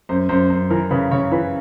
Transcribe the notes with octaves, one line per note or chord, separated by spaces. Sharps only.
F#2 C5
F#2 C5
F#2 C5
E3 A#4
C#3 B4
C#3 C#5
E3 B4